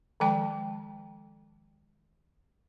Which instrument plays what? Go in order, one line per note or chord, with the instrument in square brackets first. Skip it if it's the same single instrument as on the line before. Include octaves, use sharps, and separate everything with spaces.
[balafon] D#3 F3 G#3 G5 A5